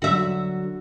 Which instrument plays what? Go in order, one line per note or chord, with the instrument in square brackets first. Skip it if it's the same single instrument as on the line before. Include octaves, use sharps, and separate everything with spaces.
[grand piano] D3 F#3 [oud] F#4 E5